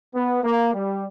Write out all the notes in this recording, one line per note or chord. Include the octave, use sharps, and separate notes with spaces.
B3
A#3
G3